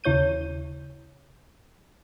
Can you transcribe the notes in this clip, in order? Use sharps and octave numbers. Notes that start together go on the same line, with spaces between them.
D#2 C#3 E4 C#5 G6 D#7